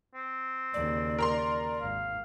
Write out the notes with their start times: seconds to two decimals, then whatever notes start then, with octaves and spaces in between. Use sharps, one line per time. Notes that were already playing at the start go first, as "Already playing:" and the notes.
0.15 C4
0.74 D#2 C#3 D5
1.19 A#4 A#5 C6
1.80 G#1 F5